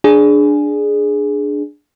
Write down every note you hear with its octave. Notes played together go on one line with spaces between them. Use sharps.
D4 G#4